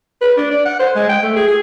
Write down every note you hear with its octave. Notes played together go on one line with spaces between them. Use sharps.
B4
D4
D5
F#5
C5
G#3
G5
A3
G#4
G#4